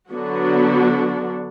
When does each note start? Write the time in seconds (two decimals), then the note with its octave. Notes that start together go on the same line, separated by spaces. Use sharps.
0.12 D3 F#3 B3 D4 F#4